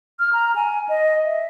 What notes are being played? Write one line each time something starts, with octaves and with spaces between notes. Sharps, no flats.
F6
A#5
G#5
D#5
E5